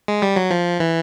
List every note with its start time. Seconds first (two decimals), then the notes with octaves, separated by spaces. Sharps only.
0.08 G#3
0.22 G3
0.36 F#3
0.51 F3
0.80 E3